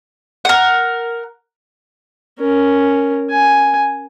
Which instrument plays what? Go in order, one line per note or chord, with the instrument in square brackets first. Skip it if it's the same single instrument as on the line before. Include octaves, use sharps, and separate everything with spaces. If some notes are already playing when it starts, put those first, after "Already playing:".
[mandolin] A#4 F#5
[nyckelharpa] C#4 A#4
G#5